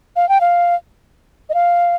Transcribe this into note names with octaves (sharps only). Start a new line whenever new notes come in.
F5
G5
F5
D#5
F5